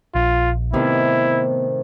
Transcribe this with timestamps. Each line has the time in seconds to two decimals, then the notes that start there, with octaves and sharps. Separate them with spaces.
0.15 A#1 F4
0.73 A2 C3 D#3 B3 E4